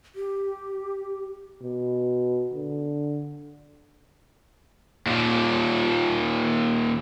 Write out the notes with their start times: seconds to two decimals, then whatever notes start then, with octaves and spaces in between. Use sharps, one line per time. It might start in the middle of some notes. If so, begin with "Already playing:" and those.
0.15 G4
1.62 B2
2.54 D3
5.06 D#2 A#2